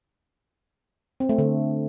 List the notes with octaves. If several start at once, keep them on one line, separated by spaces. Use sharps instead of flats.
C4
A3
D3